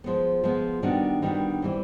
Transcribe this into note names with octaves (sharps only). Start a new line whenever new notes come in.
F3 G#3 B3
F3 G#3 B3
D#3 G3 B3 D4 F#4
D#3 G3 B3 D4 F#4
E3 G3 C4